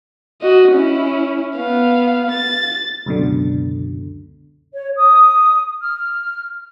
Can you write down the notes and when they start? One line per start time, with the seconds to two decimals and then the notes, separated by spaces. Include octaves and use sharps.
0.42 F#4 D#5
0.72 C#4 E4
1.57 B3 F5
2.32 A6
3.06 C#2 F#2 B2 D3
4.72 C#5
4.97 D#6
5.80 F6